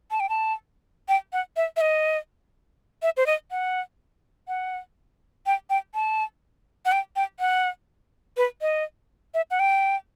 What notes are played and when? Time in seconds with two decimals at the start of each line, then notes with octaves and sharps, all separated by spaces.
0.11 A5
0.20 G5
0.29 A5
1.08 G5
1.33 F#5
1.56 E5
1.77 E5
1.81 D#5
3.02 E5
3.17 C5
3.26 D#5
3.51 F#5
4.48 F#5
5.46 G5
5.70 G5
5.94 A5
6.85 F#5
6.92 G5
7.16 G5
7.40 F#5
8.37 B4
8.61 D#5
9.34 E5
9.51 F#5
9.60 G5